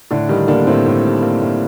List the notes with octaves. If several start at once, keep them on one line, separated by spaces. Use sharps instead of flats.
A2 D3 D4
D#3 G3 D#4
D3 A#3 D4
A2 C4
A2
G3
A#3
A2